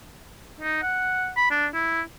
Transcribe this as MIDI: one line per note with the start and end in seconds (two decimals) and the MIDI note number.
0.61 0.82 63
0.83 1.30 78
1.37 1.47 83
1.51 1.66 62
1.74 2.02 64